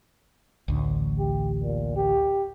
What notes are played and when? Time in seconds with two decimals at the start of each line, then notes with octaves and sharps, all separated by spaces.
0.68 A1 D2
1.19 G4
1.63 A#2
1.96 G4